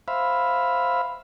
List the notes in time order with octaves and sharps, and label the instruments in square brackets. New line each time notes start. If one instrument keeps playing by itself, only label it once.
[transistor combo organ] C5 E5 F5 B5